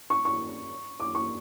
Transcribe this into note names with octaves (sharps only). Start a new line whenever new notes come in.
C#6
C#6
D6
C#6